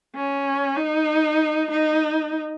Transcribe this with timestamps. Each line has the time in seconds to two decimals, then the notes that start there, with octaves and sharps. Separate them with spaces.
0.15 C#4
0.77 D#4
1.71 D#4